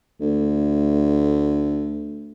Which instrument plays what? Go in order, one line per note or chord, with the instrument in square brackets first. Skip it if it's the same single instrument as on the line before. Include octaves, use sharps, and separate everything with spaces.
[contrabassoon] D2 [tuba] A3